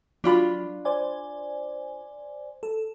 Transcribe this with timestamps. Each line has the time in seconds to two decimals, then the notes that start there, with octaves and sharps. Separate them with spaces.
0.24 F#3 D4 F4 B5
0.85 C5 D5 G#5
2.63 A4